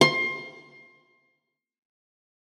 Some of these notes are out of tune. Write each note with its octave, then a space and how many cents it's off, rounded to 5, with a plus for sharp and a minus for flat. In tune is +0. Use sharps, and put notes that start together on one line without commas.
C6 +25